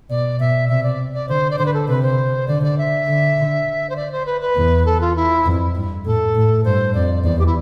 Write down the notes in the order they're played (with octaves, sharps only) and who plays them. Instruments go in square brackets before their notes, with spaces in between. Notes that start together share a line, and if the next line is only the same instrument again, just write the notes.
[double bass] B2 [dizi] D5
[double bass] B2 [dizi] E5
[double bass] C3 [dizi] E5
[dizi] D5
D5
[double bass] D3 [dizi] C5
[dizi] D5
[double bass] D3 [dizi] C5
[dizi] B4
A4
[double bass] C3 [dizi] B4
[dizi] C5
[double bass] D3 [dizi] D5
[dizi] D5
E5
[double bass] D3
[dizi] C5
D5
C5
B4
B4
[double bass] E2
[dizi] A4
F4
E4
[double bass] F2
G2
[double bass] A2 [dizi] A4
[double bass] A2
[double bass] G2 [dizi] C5
[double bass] F2 [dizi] D5
[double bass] E2 [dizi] D5
[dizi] G4
E4